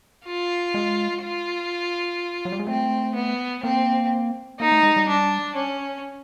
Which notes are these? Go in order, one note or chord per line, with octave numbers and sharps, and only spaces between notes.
F4
G#3
F4
F#3
G3
G#3
A3 C4
B3
A#3 C4
A#3 D#4
A3
G#3
G3
D4
C#4